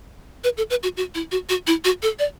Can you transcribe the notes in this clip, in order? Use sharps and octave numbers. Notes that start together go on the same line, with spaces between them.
B4
A4
B4
F#4
F#4
E4
F#4
F#4
E4
F#4
A4
D5